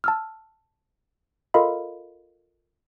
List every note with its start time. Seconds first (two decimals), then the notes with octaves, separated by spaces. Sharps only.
0.04 A5 E6 F6
1.54 F4 A4 A#4 D#5 F5 B5